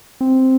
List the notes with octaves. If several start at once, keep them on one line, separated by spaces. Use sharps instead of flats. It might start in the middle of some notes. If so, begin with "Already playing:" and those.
C4